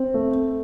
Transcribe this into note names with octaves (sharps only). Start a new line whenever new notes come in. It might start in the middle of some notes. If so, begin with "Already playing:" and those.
Already playing: C4
A3